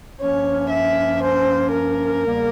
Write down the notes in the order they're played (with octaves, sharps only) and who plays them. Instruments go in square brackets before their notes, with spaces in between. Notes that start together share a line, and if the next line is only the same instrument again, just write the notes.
[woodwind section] G2 F3 A#3 C#4 [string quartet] C#5
[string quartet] E5
C5
A#4
[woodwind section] E2 C#3 G3 A#3